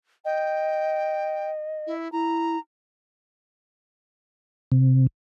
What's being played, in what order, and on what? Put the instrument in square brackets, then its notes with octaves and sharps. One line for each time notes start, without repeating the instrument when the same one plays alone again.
[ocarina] D#5 [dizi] G5
[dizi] E4
[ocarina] E4 [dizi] A#5
[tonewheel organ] C3